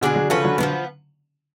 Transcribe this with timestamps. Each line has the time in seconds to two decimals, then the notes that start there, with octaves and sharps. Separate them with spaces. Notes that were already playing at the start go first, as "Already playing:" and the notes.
0.01 B2 D3 G#3 D4 G#4
0.16 D3 F#3
0.30 C#3 F3 A3 C#4 F#4 B4
0.44 D3 F#3
0.58 D3 F3 F#3 G#3 B3